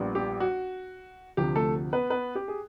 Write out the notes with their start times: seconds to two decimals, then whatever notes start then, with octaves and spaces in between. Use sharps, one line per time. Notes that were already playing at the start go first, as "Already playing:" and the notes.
Already playing: A#1 A#2 G3 B3
0.15 G4
0.40 F#4
1.37 D2 C3 F3 G4
1.56 A3 A4
1.93 B3 B4
2.10 B3 B4
2.35 G4
2.48 G#4